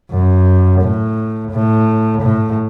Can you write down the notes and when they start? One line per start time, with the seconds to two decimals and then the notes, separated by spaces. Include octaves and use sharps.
0.11 F#2
0.82 A2
1.52 A2
2.22 A2